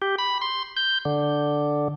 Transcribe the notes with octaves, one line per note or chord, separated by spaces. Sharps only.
G4
B5
C6
G6
D3